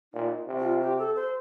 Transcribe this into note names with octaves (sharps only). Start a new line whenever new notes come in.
A#2 D#4
C3
F4
G4
A4
C5